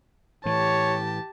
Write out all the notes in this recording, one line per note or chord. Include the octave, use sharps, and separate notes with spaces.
A2 E3 G4 C#5 A5